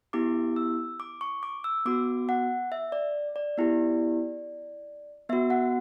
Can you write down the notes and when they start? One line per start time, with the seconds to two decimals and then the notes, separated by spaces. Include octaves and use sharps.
0.13 B3 E4 G4 D6
0.56 E6
1.00 D6
1.21 C#6
1.43 D6
1.64 E6
1.86 B3 F#4 D6
2.29 F#5
2.72 E5
2.92 D5
3.36 D5
3.58 B3 E4 G4
5.29 B3 F#4 E5
5.50 F#5